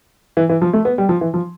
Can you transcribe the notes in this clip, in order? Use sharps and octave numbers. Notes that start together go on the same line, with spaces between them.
E3
E3
F3
A3
B3
G3
F3
E3
F3